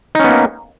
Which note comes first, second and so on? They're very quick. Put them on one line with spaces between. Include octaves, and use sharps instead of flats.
D#4 C#4 B3 A#3